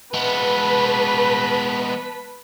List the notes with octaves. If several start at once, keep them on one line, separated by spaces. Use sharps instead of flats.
G#3 B3 B4 A5 B6